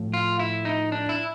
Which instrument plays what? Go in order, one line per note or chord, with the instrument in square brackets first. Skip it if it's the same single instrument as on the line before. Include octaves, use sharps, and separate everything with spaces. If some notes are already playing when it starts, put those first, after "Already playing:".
Already playing: [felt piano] A2 F3
[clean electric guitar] F4
E4
D#4
D4
E4